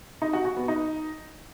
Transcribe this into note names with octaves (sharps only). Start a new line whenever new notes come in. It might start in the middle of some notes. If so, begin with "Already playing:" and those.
D#4
F#4
F#4
B3
D#4